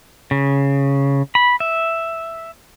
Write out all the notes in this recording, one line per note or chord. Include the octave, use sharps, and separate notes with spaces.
C#3
B5
E5